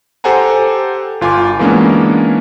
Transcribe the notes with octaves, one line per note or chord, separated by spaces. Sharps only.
G4 A4 C5 F#5 G#5 A#5
G1 F4 G#5 D6
E3 G#3 A#3 B3 C#4 D4